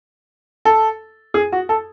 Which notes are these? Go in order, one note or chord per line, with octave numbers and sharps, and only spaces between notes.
A4
G#4
F#4
A4